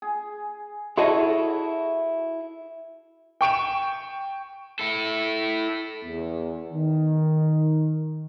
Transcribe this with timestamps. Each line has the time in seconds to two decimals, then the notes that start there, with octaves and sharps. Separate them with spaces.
0.02 G#4
0.98 E4 F#4 G#4 A4 C#5 D#5
3.41 G5 C#6 D7 E7
4.79 E4 A4
6.03 E2
6.72 D#3